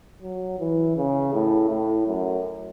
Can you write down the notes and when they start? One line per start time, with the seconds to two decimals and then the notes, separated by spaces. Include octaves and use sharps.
0.22 F#3
0.59 E3
0.96 C#3
1.33 A2
1.70 A2
2.07 F#2